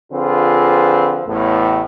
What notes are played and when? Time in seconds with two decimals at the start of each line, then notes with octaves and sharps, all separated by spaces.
0.13 D3 F3 C4 F4 G#4 B4
1.27 A1 E2 A2